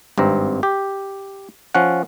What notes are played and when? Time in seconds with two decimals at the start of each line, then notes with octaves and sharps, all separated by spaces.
0.18 G#1 G2 C4 A#5
0.63 G4
1.75 F3 C#4 F#5